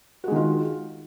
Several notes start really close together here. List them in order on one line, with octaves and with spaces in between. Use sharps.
F#4 G#3 D#3 F4